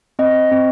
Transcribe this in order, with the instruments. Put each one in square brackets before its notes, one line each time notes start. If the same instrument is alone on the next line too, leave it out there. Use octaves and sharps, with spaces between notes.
[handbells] C4 D#5
C4